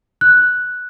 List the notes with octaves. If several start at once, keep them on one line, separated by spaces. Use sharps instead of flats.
F#6